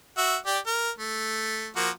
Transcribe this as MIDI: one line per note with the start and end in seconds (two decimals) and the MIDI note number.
0.17 0.36 66
0.17 0.36 76
0.46 0.59 67
0.46 0.59 74
0.66 0.90 70
0.98 1.70 57
1.76 1.90 53
1.76 1.90 58
1.76 1.90 66